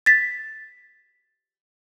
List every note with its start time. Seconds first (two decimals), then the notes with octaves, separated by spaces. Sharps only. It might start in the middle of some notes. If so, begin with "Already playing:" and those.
0.06 A6 B6